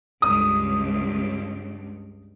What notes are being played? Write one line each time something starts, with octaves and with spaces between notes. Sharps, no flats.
C#2 G2 D#6